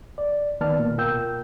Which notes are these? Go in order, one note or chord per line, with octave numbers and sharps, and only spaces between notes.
D5
D2 D#3 B3 D5 A5 F6
A#2
B2 F4 A#4 G5 E6 G6